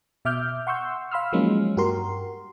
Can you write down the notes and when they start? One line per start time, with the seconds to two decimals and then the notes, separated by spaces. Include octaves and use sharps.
0.25 B2 E5 D6 F6 G6
0.67 F#5 C6 C#6 E6 G6
1.12 F5 B5 C6 E6 F6
1.33 F3 F#3 G#3 A#3 C#4 D#4
1.77 G2 F#4 G4 A#4 C6